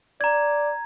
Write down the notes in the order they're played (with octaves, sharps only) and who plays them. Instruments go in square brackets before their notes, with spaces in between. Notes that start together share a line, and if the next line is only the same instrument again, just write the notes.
[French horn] D5 [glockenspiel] A#5 G#6